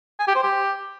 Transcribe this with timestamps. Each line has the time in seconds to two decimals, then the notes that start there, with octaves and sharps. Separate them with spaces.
0.20 G#5
0.28 G4
0.35 C5
0.43 G4